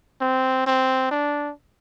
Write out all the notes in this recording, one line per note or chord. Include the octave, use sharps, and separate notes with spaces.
C4
C4
D4